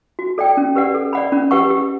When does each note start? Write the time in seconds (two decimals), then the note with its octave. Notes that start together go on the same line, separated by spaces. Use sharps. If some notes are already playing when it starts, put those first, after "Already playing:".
0.19 F#4
0.38 A4 D5 G5
0.57 C#4
0.75 G4 B4 D5 F#5
0.95 A4
1.13 D5 F#5 B5
1.32 C#4
1.51 G4 B4 F#5 C#6
1.70 G4